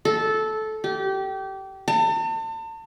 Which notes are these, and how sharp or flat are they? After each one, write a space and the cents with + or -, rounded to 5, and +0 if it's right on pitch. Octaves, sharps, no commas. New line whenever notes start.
A4 -15
G4 -25
A5 +40